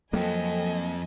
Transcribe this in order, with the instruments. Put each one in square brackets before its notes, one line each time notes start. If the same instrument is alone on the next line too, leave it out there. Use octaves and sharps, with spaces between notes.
[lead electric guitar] F2 C4 [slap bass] F#3 A#3 [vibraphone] A4 G5 [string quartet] D#5 G#5